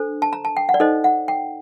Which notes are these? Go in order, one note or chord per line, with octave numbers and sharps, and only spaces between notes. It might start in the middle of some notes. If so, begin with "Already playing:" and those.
Already playing: D4 A4 C5
A5
A#5
A5
G5
F#5
D5
D#4 A4 C5 D#5
F#5
G5